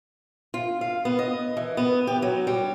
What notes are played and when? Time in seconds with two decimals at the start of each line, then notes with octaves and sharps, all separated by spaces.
0.54 F4
0.81 F5
1.05 B3
1.19 D#5
1.57 E3
1.77 B3
2.07 G4
2.22 F#3
2.47 G3